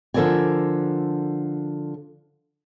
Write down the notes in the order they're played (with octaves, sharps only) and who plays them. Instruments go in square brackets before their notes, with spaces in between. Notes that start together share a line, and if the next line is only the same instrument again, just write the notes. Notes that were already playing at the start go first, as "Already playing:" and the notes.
[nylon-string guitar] D3 F3 A4 A#4 D5 G#5